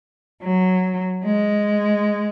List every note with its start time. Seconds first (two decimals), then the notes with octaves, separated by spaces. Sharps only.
0.42 F#3
1.24 G#3